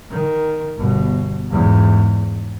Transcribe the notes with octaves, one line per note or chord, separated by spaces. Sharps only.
D#3
G1 B2
E2 G#2